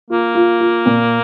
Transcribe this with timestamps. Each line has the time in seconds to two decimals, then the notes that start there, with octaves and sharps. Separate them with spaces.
0.10 A#3 F4
0.35 F4
0.61 F4
0.86 A#2